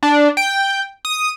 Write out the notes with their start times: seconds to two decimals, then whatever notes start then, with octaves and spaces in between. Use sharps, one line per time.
0.03 D4
0.37 G5
1.05 D#6